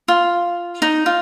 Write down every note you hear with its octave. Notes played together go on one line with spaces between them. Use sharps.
F4
D#4
F4